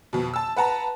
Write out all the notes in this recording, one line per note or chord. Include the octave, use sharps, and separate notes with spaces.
F2 B2
A5 E6
B4 F#5 A5 A#5